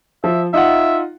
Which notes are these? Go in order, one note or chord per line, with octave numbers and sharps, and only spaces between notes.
F3 E5
D#4 F4 E5 F#5